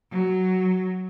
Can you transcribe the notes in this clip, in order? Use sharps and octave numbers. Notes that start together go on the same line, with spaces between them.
F#3